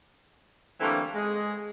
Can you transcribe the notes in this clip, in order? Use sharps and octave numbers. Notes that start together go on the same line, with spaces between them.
D3 E3 G3 A3 A#3 C4
G#3